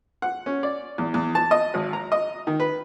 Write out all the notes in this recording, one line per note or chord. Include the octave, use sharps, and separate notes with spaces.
F#5
C#4
D5
E2
E2
A5
D#5
G#1
A#5
D#5
D#3
B4